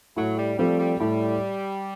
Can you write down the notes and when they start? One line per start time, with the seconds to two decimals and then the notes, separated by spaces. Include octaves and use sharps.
0.16 A2 F#3
0.37 G3
0.58 F3 G3 A3 C4
0.79 G3
1.00 A2 G3